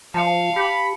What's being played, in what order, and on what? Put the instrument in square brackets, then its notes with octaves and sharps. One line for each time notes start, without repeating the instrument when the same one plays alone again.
[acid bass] F3 [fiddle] F5 [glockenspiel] A5 C#7
[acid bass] G4 [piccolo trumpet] B5 [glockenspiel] C#7